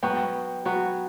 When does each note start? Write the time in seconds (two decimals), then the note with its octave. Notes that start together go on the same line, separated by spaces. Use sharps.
0.03 F#3 B3 F#4 G5
0.65 F#3 B3 F#4